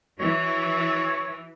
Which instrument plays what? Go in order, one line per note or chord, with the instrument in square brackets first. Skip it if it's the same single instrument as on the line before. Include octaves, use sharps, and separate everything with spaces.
[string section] E3 [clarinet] F#4 [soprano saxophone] C#5